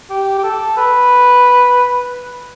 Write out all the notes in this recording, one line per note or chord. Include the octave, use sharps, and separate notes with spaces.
G4
G4
A4
B4